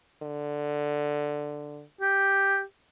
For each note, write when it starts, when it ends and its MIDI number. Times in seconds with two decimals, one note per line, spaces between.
0.23 1.83 50
2.01 2.62 67